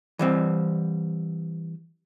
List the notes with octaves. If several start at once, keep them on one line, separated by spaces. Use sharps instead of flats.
E3 G3 C4